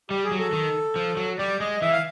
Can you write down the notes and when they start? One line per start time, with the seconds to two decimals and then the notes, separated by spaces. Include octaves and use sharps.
0.10 G3 G4
0.24 G#4
0.31 F#3
0.39 A4
0.53 D#3
0.96 F3
1.17 F#3
1.38 G3 D5
1.60 G#3 D#5
1.82 E3 E5
1.92 F5